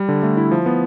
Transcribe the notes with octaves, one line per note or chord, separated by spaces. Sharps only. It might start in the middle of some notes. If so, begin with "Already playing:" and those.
Already playing: G3
D3
A3
E4
F3
B3